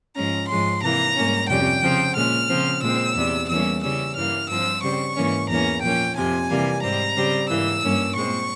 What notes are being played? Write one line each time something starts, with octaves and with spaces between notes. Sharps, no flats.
G#2 F3 G#3 C#4 A#5
G#2 F3 G#3 C#4 C6
C3 E3 A#3 A#5
G#2 G3 A#3 C#4
F2 C3 G3 C#4 G5
C#3 F3 C4
A#2 G#3 C#4 F6
C#3 F3 C4
A#2 G#3 C4 E6
E2 C3 G3
E2 E3 G3 A#3 C#4 E6
C#3 E3 G3 C#4 E6
G2 E3 A#3 F6
G2 F3 C4 E6
C#3 G3 C4 C#6
G#2 E3 A#3 C#4
E2 E3 A#3 C#4 A#5
A#2 F3 A#3 C#4 G5
F2 C3 F3 G#5
C3 E3 G3 A#3
G#2 G3 C4 A#5
C#3 G3 C4
G#2 E3 A#3 E6
G2 G3 A#3 C#4
A#2 G#3 C4 C#6